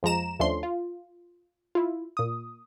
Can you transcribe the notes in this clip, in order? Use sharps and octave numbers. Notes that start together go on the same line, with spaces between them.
F2 F3 G#3 A#5 E7
D#2 F3 A3 C#4 D4 C6
F4
E4 F4
A#2 D#6